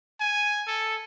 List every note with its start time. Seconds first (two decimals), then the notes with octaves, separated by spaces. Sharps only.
0.20 G#5
0.67 A4